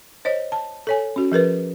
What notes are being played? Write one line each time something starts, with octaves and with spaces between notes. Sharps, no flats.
C5 C#5 D#5
A5
A4 C#5 G#5
C#4 F#4
F3 G#4 A#4 B4